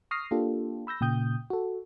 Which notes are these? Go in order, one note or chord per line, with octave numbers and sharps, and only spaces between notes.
C#6 D#6 F6 A#6 C7
A#3 D4 F4 G4 A4
B5 E6 G6 A#6
A#2 C#3 G5 D#6 G6
F#4 A4